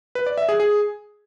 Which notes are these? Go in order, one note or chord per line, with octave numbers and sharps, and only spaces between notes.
B4
D5
E5
G#4
G#4